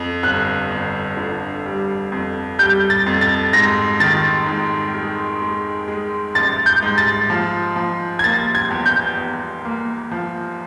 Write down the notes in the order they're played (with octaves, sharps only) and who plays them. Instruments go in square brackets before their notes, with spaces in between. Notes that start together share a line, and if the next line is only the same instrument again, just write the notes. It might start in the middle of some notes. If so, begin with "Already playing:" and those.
Already playing: [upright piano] F2
G1 F#6
G1
D3
G3
F2
G3 G6
A6
F2
A6
G#2 A#6
D#3 A6
G#2
G#3
G#3
G#3
A1 A6
G6
G#2
A6
F3
F3
G#6
A#3 A6
G#6
E2
G6
E2
A#3
F3